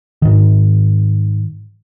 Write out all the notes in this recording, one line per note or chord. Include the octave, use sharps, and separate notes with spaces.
G#2 D#3